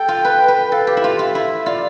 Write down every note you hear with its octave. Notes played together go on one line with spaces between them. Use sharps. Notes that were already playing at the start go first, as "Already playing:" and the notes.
Already playing: A4 G5
F4
B4
B4
A4 F5
G4
E4
F4
F4 E5
E4
F4 D5